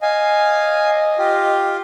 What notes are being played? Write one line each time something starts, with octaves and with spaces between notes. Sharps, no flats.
D#5 F5 G#5
F4 G4